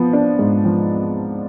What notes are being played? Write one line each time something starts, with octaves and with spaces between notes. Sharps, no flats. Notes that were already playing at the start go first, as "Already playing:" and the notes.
Already playing: F3 B3
D4
G#2
F3